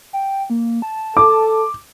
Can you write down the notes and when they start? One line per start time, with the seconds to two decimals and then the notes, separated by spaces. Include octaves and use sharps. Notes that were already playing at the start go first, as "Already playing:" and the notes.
0.13 G5
0.50 A#3
0.82 A5
1.17 A4 D6